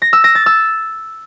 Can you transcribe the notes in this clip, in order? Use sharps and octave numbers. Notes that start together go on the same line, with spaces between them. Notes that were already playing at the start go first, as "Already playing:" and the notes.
A#6
E6
A#6
A6
E6